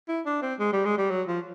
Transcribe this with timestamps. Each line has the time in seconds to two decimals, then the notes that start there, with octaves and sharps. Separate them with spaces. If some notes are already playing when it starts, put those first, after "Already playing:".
0.08 E4
0.26 D4
0.42 C4
0.60 G#3
0.73 G3
0.85 G#3
0.98 G3
1.10 F#3
1.28 F3